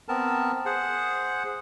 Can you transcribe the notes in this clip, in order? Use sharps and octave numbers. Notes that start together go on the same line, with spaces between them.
B3 C4 A#4 A5
G#4 C5 F#5